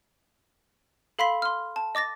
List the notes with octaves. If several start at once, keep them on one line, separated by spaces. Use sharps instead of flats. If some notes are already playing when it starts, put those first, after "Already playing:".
A4 F5 B5 C6 B6
C6 F6
A5
D#5 D6 A6 A#6